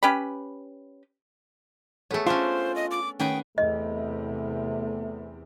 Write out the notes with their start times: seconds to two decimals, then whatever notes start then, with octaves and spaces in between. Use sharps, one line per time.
0.03 C#4 G4 B4 B5
2.11 A3 B3 G#4 A4 C#5
2.27 C#4 D4 F4 C5
2.76 D#5
2.91 D6
3.20 D#3 A3 B3 C#4 G#4 G5
3.58 E2 C3 A3 D#5